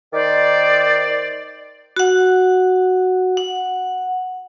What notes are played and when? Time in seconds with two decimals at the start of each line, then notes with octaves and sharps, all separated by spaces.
0.13 D#3 C5 D5
1.97 F#4 F#5
3.37 F#5